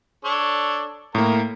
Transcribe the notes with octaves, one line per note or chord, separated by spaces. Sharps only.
D4 A4 C#5
A2 A#3 A#4